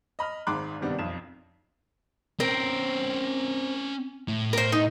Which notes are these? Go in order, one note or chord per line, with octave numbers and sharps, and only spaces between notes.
D#5 B5 F6
G#1 G#2 B5 C6 D6 F#6
G2 C3 D#3 G3 B3 D4
B1 F2 E7
C4 C#4 A#4 C5
A2
A#4 C5
D#4